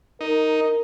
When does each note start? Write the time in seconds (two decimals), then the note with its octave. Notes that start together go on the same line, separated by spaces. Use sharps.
0.21 D#4 A#4